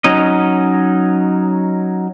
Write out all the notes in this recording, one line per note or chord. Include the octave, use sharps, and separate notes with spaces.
F#3 C#4 D#4 D#5